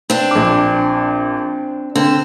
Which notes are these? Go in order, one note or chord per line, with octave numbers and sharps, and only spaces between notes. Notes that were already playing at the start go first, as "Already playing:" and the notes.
C4 D4
A#1 D6
D3 C4